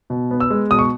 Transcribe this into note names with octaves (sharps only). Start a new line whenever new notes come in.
B2
B3
E6
G#3
B2 D#6
C#6